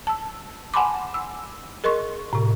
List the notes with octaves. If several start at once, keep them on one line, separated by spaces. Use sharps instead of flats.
A5 E6
F#5 G#5 A5 B5 C6 D6
E6
G#4 A#4 D#5 C6 C#6
A2 C3